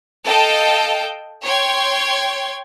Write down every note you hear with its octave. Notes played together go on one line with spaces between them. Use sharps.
A4 D#5 F5 G5 A5
C#5 G5 C6 G#6